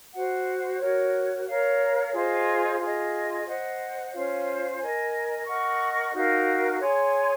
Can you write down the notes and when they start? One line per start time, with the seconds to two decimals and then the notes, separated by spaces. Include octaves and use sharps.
0.13 F#4 C5 F#5
0.80 F#4 A#4 C#5
1.47 A#4 C#5 F5
2.13 F4 G#4 C5 D#5
2.80 F4 G#4 D#5
3.46 C5 D#5 F#5
4.13 C#4 F4 C5 F5
4.80 A#4 D#5 G#5
5.46 A#4 D#5 F#5 C#6
6.13 D#4 F#4 A#4 F5
6.80 G#4 C#5 G#5 C6